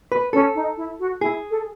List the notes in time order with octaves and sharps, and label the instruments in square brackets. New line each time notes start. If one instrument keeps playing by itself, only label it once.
[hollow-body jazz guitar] B4
[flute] C#4 [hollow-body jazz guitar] A4
[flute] D#4
E4
F#4
[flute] E4 [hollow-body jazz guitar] G#4
[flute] A4